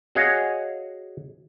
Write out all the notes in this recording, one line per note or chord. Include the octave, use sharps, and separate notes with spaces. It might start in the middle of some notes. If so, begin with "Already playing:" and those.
F#4 G#4 C#5 D#5 F5